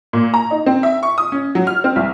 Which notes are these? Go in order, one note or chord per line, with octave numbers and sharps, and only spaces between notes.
A#2
A#5
D#4
C4
E5
C#6
D#6
C#4
F#3
F6
C4
C2